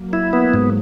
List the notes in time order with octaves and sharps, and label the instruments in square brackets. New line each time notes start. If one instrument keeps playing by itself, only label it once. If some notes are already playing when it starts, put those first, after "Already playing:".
Already playing: [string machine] F#3 A#3
[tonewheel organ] E4
B3
G#2